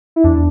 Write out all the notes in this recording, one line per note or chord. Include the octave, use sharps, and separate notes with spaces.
E4
E2 D4